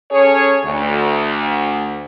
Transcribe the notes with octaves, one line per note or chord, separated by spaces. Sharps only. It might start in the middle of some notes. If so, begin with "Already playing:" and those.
C#4 G#4 A4 C#5
D2